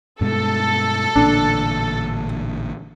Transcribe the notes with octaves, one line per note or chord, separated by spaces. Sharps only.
G2 B2 G#3 A4
A1 A#2 D3 D4